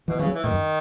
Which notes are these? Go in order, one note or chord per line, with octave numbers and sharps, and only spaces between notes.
B2 E3
C#3 E3
F#3
E3
A2 D#3
F#2